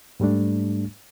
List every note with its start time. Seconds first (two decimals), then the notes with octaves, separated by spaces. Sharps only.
0.20 G#2 G3 A3 D4